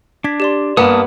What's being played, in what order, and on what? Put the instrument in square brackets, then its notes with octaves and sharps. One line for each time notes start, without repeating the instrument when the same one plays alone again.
[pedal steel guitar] D4 [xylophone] G#6 B6
[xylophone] G4 D5 C6
[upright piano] G2 A#3 [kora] B3 [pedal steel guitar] A5 D#6